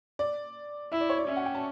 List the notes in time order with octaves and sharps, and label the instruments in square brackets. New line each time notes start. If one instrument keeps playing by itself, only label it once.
[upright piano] D5
[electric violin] E4 [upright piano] E5
[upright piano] D5
C#5
D5
[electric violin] C#4 [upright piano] E5
[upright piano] F#5
G5
A5